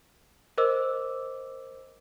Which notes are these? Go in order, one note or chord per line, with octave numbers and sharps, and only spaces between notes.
A#4 C5 D#5 D6 E6